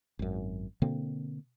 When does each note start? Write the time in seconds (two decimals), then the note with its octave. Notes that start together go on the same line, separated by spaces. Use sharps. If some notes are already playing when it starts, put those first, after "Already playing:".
0.19 G#1 F#2
0.82 B2 D3 A#3 C4